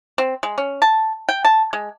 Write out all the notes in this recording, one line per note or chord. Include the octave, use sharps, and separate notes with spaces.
C4
G#3
C#4
A5
G5
A5
G#3